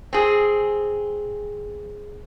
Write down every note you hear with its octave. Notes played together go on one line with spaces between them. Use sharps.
C4 G#4